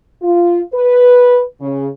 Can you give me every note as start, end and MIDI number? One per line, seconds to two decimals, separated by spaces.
0.22 0.61 65
0.73 1.42 71
1.61 1.87 49